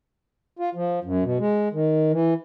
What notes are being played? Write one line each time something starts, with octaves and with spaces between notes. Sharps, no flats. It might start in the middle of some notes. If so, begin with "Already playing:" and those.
F4
F3
F#2
B2
G#3
D#3
E3